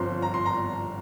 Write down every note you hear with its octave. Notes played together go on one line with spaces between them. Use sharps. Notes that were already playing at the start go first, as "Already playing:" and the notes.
Already playing: G1 G2 F3 C4 A#5 C6
A#5
C6
A#5